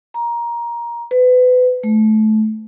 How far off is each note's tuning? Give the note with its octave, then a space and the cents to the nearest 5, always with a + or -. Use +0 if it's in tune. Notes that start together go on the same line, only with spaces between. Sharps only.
A#5 +15
B4 +30
A3 -25